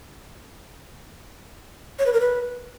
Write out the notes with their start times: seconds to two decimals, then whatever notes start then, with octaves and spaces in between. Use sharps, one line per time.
1.99 C#5
2.06 B4
2.13 A#4
2.20 B4